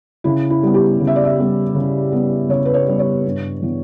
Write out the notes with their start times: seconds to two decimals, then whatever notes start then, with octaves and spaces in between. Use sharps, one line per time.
0.24 C#3 E4
0.50 E4
0.63 G3 B3
0.74 G4
1.00 C#3
1.07 E5
1.16 D5
1.25 E5
1.38 G3 B3
1.75 C#3
2.12 G3 B3
2.49 C#3 C#5
2.65 B4
2.74 C#5
2.87 G3 B3
2.99 C#5
3.25 G2
3.62 E3 B3